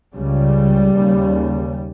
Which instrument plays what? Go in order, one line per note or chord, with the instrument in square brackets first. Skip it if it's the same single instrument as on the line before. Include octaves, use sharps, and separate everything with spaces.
[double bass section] C#2 C#3 G3
D#2 C#3